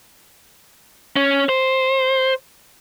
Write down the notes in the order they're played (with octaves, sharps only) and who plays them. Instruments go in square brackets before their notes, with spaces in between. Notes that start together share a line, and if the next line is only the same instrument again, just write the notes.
[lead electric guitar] C#4
C5